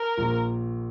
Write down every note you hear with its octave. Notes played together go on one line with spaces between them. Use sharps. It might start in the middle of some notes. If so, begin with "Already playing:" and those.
Already playing: A#4
A#1 A#2